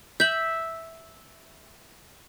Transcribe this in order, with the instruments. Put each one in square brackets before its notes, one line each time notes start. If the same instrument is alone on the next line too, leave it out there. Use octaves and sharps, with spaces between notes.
[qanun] E5 [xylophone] G6 F#7